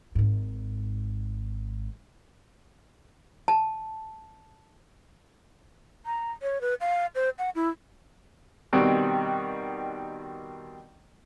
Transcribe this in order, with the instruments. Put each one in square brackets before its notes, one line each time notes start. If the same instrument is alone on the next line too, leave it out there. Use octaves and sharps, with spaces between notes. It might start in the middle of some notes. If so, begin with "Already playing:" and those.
[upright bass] G#1 G#2
[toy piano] A5
[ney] A#5
C#5
B4
F5
C5
F#5
E4
[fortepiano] B2 D#3 G3 C4 F#4